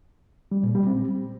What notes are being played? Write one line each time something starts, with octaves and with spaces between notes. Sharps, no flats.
G3
A#2
G3
C4